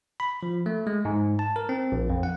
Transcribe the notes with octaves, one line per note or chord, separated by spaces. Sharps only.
B5
F3
A3
G#3
G#2
A5
A#4
C4
A#1
F2
F#5